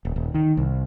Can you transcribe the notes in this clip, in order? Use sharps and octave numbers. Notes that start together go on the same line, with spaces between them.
D#1
D#1
D#3
C2